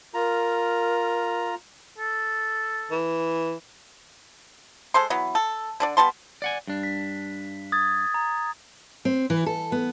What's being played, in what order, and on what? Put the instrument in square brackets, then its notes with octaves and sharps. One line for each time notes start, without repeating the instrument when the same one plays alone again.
[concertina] F4 A#5 [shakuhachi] A#4
[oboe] A4
[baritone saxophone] E3
[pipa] G#3 A4 C5 C6
E3 F#3 B3
A4
D3 D4 D5
G3 B3 A5 C6
[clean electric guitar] D5 F#5 G#5
G2 D4
[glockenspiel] B6
D#6 G#6 A6
A#5
[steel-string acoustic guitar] C4
E3
A4
B3